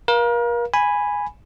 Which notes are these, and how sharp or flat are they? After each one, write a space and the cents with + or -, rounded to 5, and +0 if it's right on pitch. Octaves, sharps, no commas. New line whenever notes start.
A#4 +35 F5 +0
G#5 -5 B5 +0